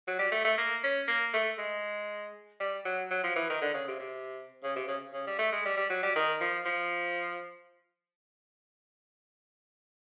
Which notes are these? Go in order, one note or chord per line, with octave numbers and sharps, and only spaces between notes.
F#3
G3
A3
A3
A#3
C#4
A#3
A3
G#3
G3
F#3
F#3
F3
E3
D#3
D3
C#3
C3
C3
C#3
C3
C#3
C#3
G3
A3
G#3
G3
G3
F#3
G3
D#3
F3
F3